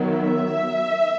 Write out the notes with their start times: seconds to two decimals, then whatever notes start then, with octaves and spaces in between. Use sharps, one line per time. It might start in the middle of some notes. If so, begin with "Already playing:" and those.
Already playing: D#3 F#3 B3
0.14 E5